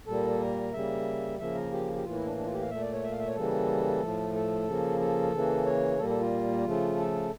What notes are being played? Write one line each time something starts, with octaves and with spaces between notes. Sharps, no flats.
A#2 G3 A#3 A4
A#4
C#3 G3 A#3 E5
C#3 F3 A#3 E5
A#4
G4
G4
A2 E3 A#3 F4
E4
D4
D4
F4
G4
F5
A#2 A3 E5
D5
C#5
E5
F5
E5
C#5
C#3 E3 G3 A#3 A4
A2 F3 A3
A4
C#3 F3 A#3
A4
C#3 E3 A#3
C#5
A#2 G3 A#3 A4
A4
F4
C#3 F3 A3
A4